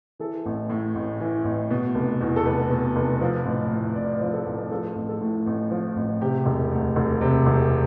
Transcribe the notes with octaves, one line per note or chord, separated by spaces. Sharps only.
E3 A4
A1
A2
A1
E3
A1
B2
F1
E2
A4
F1 B4
B2
F1
F3
A1
A2
A1 D5
F3
A4
A1
F3 A4
A1
A4
A2
A1
F3
A1
C3 G4
E1
D2
E1
C3
E1